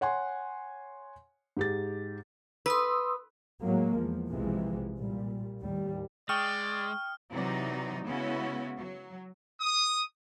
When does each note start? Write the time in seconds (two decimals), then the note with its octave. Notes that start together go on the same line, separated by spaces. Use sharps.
0.01 C#5 F#5 G#5 C6
1.57 G#2 G4 A6
2.66 B4 C6 D#6 E6
3.62 A2 F#3 G#3 A#3
3.96 E2 F3
4.29 B1 C3 E3 F3 G#3
4.99 A#2 G3
5.60 D#2 A2 G3
6.29 G#3 D5 G5 C#6 D#6 F6
7.31 C3 E3 F#3 D#4 D5
8.05 C#3 G#3 B3 C#4 E4 F#4
8.77 F#3
9.60 D#6